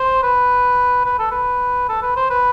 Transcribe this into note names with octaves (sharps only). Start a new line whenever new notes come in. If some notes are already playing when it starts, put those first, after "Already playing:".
Already playing: C5
B4
B4
A4
B4
A4
B4
C5
B4